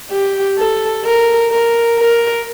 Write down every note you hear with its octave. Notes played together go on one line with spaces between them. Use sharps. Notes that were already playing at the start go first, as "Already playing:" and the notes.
G4
A4
A#4
A#4
A#4